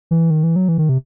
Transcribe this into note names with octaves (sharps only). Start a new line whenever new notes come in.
E3
D#3
E3
F#3
E3
D#3
C3